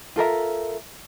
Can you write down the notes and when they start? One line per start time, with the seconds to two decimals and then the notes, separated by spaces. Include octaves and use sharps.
0.16 F4 A4 A#4 E5